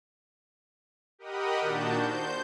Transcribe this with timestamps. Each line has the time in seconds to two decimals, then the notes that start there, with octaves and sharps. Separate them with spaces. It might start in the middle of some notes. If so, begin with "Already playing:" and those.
1.19 G4 A#4 D#5 F#5 B5 D#6
1.61 A#2 D#3 D4 F#4 A5 G6
2.03 C5 G6